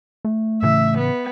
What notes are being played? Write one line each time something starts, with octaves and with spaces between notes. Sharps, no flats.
A3
A2 C#3 E3 E5
B3